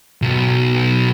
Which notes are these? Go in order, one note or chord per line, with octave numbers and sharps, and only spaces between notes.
B1